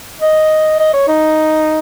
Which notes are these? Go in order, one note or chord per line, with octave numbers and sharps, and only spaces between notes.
D#5
D#5
C#5
D#4